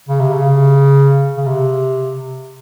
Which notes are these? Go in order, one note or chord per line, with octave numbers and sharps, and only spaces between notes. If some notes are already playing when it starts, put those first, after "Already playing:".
C#3
C3
C#3
C#3
C3